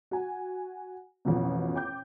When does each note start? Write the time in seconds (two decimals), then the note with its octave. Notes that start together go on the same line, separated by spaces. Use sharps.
0.11 F#4 G#5
1.25 A1 F2 B2
1.75 G5 D6 G6